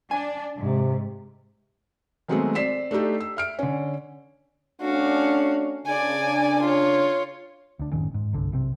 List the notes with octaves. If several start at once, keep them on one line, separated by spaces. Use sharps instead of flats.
D4 G#5
G#2 C3
D#3 F#3 G#3 A3 B3 C4
C4 D5 B6 C7 E7
A3 D4 D#4 G4 A4
E6
E5 F6 D7
D3 C#4
A3 C#4 D4 F#4 F5
C#3 D4 D5 G#5
F4 C#5
D2 D4
F#1 A2 D#3 C#4
G#2
G1 C2 D3
B1 C3 C4